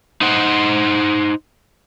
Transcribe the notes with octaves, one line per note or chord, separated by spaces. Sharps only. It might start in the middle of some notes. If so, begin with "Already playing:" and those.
D#4 C5 F#5